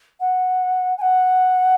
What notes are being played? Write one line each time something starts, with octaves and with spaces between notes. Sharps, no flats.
F#5
G#5
F#5